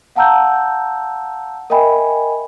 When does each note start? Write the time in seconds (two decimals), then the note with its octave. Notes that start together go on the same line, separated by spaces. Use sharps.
0.16 F5 F#5 A5 A#5 E6 G6
1.70 A#4 D#5 E5 G5 G#5 B5